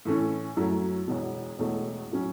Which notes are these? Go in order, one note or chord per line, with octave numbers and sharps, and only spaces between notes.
A2 E3 A3 C#4
F#2 F#3 A3 E4
E1 E2 B2
E1 E2 B2 A3
A2 F#3 C#4